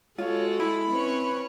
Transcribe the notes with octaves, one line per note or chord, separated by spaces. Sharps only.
G#3 F4 F#4 A4 C#5
E4 B5
C4 C#4 B4 C#5